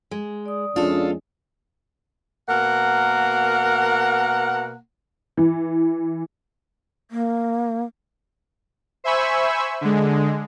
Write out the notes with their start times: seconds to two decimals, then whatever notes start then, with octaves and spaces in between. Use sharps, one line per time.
0.11 G#3
0.46 D5 D#6
0.76 F2 G#3 C#4 D4 F4 A4
2.49 B2 A#3 A#4 F#5
5.37 E3
7.10 A#3
9.04 C5 E5 G#5 B5 C#6 E6
9.81 D3 G#3